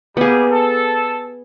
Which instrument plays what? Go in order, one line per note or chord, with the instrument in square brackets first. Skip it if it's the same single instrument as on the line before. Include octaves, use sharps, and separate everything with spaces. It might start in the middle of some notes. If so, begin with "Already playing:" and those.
[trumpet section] G3 A#3 [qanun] B3 G#4
[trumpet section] A4